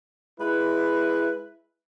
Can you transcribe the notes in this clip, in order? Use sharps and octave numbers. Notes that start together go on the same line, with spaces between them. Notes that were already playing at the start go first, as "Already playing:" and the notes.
G#3 E4 B4